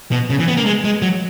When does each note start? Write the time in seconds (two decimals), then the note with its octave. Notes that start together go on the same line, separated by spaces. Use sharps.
0.12 B2
0.30 C#3
0.39 E3
0.48 B3
0.57 A#3
0.66 G#3
0.84 G#3
1.02 F#3